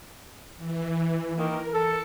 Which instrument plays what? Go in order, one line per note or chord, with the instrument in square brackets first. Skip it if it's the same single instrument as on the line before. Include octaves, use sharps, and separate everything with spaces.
[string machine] E3
[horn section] D#3 A#3 [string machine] A#4
[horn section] A4 [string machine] C#7